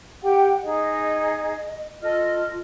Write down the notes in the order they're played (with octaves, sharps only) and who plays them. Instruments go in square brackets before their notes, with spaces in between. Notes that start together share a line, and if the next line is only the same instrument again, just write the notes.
[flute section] G4 G5 [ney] F#5
[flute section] D#4 G#4 [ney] D#5
[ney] F4 [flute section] A4 D#5 F6